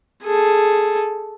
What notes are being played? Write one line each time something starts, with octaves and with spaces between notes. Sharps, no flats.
G#4 A4